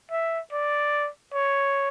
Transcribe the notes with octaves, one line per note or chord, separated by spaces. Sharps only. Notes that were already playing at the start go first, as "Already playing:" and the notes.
E5
D5
C#5